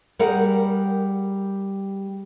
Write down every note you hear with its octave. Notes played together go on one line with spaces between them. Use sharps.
G3 G#4 A#4 F#5